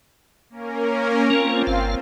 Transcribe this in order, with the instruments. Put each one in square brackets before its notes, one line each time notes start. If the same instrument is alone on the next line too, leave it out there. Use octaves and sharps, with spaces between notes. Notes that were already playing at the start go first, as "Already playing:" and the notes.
[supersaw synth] A#3 C#4 A#4
[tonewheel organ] A#3 C#4 [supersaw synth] C4 F4
[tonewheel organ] G1 F5